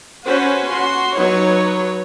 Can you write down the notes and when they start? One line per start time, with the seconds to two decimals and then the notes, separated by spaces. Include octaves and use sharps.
0.26 C#4 F#4 B4 C5
0.69 F#4 C6
1.16 F#3 D#4 B4 C#5